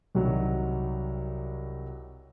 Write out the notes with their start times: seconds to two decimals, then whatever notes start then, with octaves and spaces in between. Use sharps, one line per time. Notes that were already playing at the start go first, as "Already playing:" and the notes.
0.15 C2 D#3 F#3